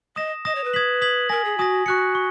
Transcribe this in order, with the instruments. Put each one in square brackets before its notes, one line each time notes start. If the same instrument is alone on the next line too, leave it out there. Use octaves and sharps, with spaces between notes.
[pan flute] D#5 [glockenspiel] D#6 A#6 E7
[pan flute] D#5 [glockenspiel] D#6 A#6 E7
[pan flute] C#5
B4
[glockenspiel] D#6 G#6 B6 F#7
D#6 G#6 B6 F#7
[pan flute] A#4 [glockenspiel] G#5 D#6 A#6
[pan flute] G#4
[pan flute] F#4 [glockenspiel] G#5 D#6 A#6
[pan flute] F#4 [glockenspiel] C#6 F#6 C#7
[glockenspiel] C#6